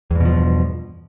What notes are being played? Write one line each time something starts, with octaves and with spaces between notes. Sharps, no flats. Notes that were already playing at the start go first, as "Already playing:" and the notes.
E2 G2 B2 F3